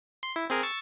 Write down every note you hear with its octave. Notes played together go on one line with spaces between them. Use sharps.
C6
E4
C4 G#4 A#4
C#6 E6 A6